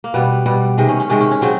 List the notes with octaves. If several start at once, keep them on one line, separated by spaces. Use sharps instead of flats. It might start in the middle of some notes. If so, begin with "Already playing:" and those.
A#3
B2 G3 B3
B2 G3
C3 D#3 G#3
C#4
C#4
C3 D#3 G#3 C#4
C#4
C#4
C#3 F#3 C4